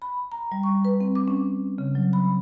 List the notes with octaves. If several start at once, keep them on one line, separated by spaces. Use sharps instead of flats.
B5
A#5
G3
C#6
B4
C4
D6
C#4
C#3
F#3
B5